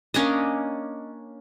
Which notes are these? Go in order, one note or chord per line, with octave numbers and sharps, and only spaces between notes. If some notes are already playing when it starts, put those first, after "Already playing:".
A#3 C#4 D4 D#5